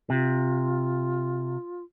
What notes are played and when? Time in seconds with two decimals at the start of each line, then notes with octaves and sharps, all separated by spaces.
0.10 C3 F4